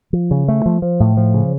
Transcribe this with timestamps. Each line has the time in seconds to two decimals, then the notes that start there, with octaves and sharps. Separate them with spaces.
0.13 F3
0.31 C#3
0.48 A3
0.66 F3
0.82 F3
1.00 A2
1.17 F3
1.34 C#3